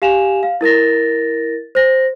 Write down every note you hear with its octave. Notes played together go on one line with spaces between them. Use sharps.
G4 F5 G#5 E7 F7
F5
E4 A#4 A6 A#6
C5 A#6